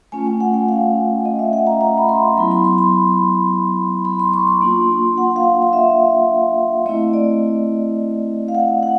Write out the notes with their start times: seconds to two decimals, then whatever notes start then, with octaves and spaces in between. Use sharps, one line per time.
0.12 A3 C#4 F4 G#5
0.27 G5
0.40 F#5
0.54 G5
0.69 F5
1.25 D#5
1.39 E5
1.53 F#5
1.67 A#5
1.81 A#5
1.98 B5
2.09 C6
2.37 F#3 B3 E4 B5
2.51 C6
2.64 C6
2.78 B5
4.05 B5
4.19 C6
4.33 C#6
4.47 C6
4.61 A#3 D4 F4
5.18 F#5
5.36 F5
5.62 F5
5.73 E5
6.86 A3 C4 E4 D#5
7.13 D5
8.48 F5
8.55 F#5
8.83 F#5